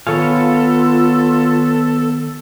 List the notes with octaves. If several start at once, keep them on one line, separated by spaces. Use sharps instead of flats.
D#3 B3 F4 G#4 A4 C#5 F5 G#5